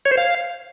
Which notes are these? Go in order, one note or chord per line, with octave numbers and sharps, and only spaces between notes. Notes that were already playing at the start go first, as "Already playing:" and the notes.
C#5
C5
F5